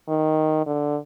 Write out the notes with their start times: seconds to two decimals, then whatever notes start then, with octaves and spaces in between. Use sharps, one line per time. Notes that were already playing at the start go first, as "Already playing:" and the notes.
0.08 D#3
0.66 D3